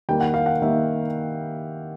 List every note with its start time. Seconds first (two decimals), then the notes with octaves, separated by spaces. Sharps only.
0.09 D#3 G3 A#3 G5
0.21 F#5
0.34 F5
0.46 F#5
0.62 D#3 G3 A#3 E5